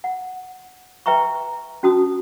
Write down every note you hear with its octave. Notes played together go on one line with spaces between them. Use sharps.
F#5
B4 E5 G5 A#5 C#6
C#4 F#4 A5 D#6